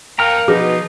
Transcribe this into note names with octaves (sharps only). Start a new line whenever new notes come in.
A#3 A#4 F5 G5 A#5 F6
B2 F3 D#4 G#4